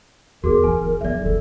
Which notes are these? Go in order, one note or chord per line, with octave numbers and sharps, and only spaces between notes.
E2 C#4 F#4 G#4 A#4
E3 G#5
F1
F#3 D4 D5 E5
F#1 C#3 A4